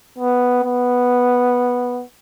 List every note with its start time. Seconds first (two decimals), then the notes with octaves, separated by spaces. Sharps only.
0.19 B3
0.64 B3